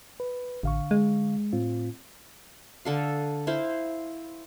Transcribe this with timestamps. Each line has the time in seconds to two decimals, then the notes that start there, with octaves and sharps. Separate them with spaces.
0.20 B4
0.63 A1 D3 F5 C#6
0.91 G#3
1.53 A2 C4 F4
2.85 D3 A4 F5
3.47 E4 C5 F5